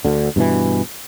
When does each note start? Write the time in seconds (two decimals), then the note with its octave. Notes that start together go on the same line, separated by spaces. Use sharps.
0.05 D2 D3
0.36 G2 B2 D3 E3